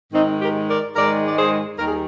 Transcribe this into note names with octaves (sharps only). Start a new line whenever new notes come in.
G#2 D#3 G#3 C4 D#4
G4 A#4
A#4 D5
G#2 D#3 G#3 A#4 D5
D5
G#4 C5
D#2 D#3 G3 A#4
G#4